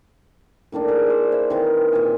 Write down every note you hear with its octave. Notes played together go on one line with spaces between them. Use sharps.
A2 D#3 A#3 D4
G#4 D6
C5 D5
B4 E5
D#3 E3 C4 D#4
A#2 E5 G#5